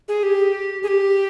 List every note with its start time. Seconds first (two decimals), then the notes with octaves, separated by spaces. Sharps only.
0.08 G#4
0.23 G4
0.83 G#4
0.88 G4